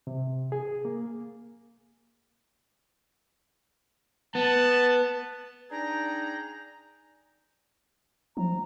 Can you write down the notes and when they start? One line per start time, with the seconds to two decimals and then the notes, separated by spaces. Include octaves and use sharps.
0.07 C3
0.52 G#4
0.85 A#3
4.35 B3 A5
5.71 D4 D#4 G#4 G5 A#5
8.37 F3 A#5